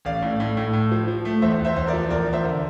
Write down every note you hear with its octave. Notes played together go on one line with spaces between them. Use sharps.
A1 D5 F5
A2
A2
A2
A2
F3
F3
A3
E2 C5 E5
E2
C5 E5
E2 C5
A#4 D5
F3
E2 A#4 D5
E2
C5 E5
D3